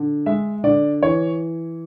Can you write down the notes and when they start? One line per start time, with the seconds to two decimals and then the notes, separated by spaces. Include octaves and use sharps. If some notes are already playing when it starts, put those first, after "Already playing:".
Already playing: D3
0.26 G#3 E5
0.64 D3 D5
1.02 E3 C#5